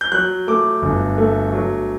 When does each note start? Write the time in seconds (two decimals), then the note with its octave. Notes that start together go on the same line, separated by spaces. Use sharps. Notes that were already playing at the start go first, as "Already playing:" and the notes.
0.01 G6
0.12 F#3 F#6
0.47 A3 D6
0.82 G1
1.18 A3
1.53 F#3